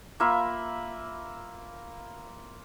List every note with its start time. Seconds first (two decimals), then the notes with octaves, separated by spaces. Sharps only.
0.20 A#3 F4 E5 B5